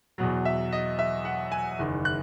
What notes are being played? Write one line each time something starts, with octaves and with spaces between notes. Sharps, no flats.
E2 B2 F#3
E5
D#5
E5
F#5
G#5
F#1 E2 D#3
F#6